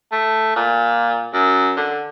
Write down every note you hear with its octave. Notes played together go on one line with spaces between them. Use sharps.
A3
A#2
F#2
D3